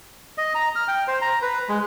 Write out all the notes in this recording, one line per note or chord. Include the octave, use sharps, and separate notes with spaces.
D#5
A#5
F6
G5
C5
A#5
B4
G#3